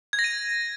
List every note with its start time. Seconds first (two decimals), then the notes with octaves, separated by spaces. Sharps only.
0.13 G#6
0.19 A#6
0.24 D#7